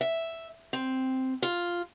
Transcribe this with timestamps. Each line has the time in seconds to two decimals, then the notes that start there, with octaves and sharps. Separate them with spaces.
0.01 E5
0.73 C4
1.42 F4